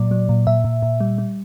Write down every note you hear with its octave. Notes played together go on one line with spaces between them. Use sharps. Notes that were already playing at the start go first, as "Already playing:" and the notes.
Already playing: A#2 F#3 D5
F#3
A#2
A#2 E5
A#2
A#2
G3
G3